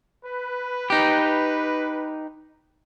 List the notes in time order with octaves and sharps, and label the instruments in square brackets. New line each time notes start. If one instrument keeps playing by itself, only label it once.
[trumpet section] B4
[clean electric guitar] D#4 G4